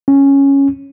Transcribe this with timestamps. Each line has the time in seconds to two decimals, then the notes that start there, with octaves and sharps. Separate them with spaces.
0.08 C#4